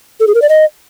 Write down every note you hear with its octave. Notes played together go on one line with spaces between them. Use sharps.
A4
G#4
A#4
D5
D#5